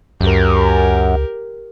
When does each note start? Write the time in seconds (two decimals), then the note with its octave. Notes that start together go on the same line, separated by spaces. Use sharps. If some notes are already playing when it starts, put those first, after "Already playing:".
0.21 C#2 F#2 G4 A#4